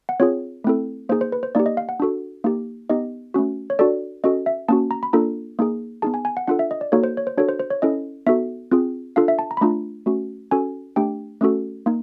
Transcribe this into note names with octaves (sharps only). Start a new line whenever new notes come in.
F#5
C4 F4 G#4 C#5
A3 C4 E4 A4
A#3 D#4 G#4 C5
C5
B4
C5
A#3 D#4 G4 D5
D#5
F5
F#5
D4 F#4 A4
A#3 D#4 G4
B3 D#4 G4 D#5
A3 C#4 F#4
C#5
D4 F#4 A4 D5
C#4 F#4 A4 D#5
E5
A#3 C#4 F#4 A5
A#5
B5
A#3 D4 F4 A4 A#5
A#3 D#4 G#4
B3 D#4 G#4 A5
G#5
G#5
F#5
D4 F4 A4 F#5
E5
D#5
D5
A#3 D#4 F#4 A4 C#5
C5
C#5
C5
D4 F#4 A4 C#5
C5
C5
C#5
C#4 E4 A4 D#5
B3 D#4 F#4 A4 E5
C4 F4 G#4
D4 F4 A4 F5
E5
A5
A#5
B5
A3 D4 F4 A#5
A3 C#4 F#4
C#4 F#4 A4 G#5
A3 D4 G4 G5
A3 C#4 F#4 A4
A#3 D#4